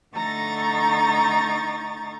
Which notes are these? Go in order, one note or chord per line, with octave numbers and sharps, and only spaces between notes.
D3 A3 D#4 A#5 C#6 A6